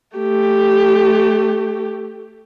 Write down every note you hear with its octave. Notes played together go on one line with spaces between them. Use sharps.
A3 G4